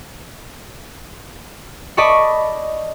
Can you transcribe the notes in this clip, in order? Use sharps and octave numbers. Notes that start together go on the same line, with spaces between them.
D5 D#5 A5 B5 C#6